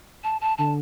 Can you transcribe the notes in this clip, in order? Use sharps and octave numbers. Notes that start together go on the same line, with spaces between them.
A5
A5
D3 A5